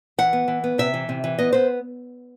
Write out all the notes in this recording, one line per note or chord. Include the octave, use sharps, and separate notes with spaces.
E3 F#5
B3
E3
B3
C3 E5
E3
C3
E3
B3 D#5
B3 C5